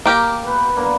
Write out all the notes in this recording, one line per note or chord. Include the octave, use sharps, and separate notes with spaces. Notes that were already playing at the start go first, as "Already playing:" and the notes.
A#3 G4 A#4
B3 B4
G2 A#3 B3